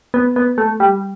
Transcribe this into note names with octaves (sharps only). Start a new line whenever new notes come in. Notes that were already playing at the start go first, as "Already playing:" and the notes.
B3
B3
A3
G3